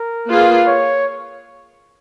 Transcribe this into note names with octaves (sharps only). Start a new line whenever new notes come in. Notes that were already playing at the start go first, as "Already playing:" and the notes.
Already playing: A#4
A#3 F4 G#4 B4
C#5